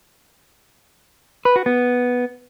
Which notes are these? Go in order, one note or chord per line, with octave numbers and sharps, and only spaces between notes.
B4
F#4
B3